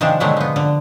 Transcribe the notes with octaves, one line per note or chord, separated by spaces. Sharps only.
C3 D#3 F3 G#3 D4
B2 D3 F#3 G#3 A3
F3 B3
D3